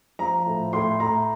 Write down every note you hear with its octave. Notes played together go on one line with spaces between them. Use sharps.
F3 A#5
A2
A2 C6
A2 A#5